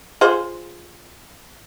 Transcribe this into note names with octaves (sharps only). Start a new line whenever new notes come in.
F4 G#4 C5